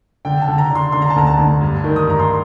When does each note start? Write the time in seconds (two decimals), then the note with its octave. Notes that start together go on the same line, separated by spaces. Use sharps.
0.25 D3 G5
0.41 A5
0.48 D3
0.58 A#5
0.71 D3 C6
0.92 D3 C6
1.02 A#5
1.10 A5
1.16 D2 A#5
1.27 A5
1.38 D2
1.61 G2
1.84 D#3
1.96 D#6
2.07 G2 A#5
2.19 C6